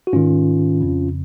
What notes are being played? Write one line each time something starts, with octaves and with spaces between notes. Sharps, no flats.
F#4
G#2 D#3 C#4 F4
F2 C#3